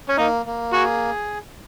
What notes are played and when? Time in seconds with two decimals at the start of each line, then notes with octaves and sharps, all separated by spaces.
0.09 C#4
0.18 A#3 D#4
0.46 A#3
0.73 F#4 G#4